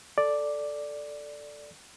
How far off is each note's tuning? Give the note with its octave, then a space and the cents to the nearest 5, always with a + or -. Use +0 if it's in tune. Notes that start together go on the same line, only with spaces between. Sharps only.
A4 +0 D5 +0